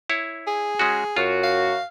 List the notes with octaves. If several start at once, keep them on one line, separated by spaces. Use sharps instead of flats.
E4 C#5
G#4
G#3 C#4 F#4
F#2 F4 F#4
F5